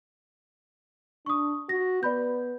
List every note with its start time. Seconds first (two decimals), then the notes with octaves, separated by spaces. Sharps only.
1.26 D4 C#6 D#6
1.69 F#4 A#6
2.03 B3 D5 B5 G6